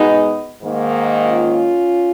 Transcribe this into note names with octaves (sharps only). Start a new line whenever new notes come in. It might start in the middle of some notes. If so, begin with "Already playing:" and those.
Already playing: B2 G#3 B3 D#4
G#2 D#3 A#3
C#4 F4